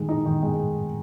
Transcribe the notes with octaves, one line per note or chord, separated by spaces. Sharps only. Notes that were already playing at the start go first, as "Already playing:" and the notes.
Already playing: D#3 G#3
D#4
D#3
G#3